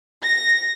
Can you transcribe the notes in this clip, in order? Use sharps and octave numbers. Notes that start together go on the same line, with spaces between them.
A#6